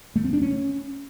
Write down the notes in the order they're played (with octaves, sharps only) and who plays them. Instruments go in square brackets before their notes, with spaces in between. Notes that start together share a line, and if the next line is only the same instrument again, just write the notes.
[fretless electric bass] A3
C4
D4
C#4